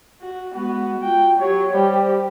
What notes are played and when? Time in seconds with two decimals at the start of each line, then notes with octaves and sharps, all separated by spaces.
0.21 F#4
0.55 G#3 B3 F#4
1.03 F4 G5
1.39 F#3 G4 C#5
1.73 G3 G4 C5